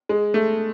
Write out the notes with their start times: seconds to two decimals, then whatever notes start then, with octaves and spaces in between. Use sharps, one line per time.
0.09 G#3
0.34 A3